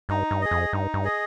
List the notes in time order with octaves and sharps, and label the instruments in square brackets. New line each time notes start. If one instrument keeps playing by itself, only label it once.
[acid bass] G2 [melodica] D#4
[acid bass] G2
[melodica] G#4 D#5
[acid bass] F2
[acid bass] G2 [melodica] D#4
[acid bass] G2
[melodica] G#4 D#5